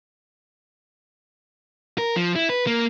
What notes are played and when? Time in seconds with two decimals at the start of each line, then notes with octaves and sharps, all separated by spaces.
1.98 A#4
2.16 F3
2.36 E4
2.49 B4
2.67 A#3